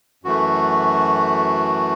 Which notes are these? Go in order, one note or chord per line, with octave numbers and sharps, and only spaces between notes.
F#2 E3 A3 F#4